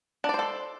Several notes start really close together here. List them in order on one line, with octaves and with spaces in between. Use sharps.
D4 D5 C5 A4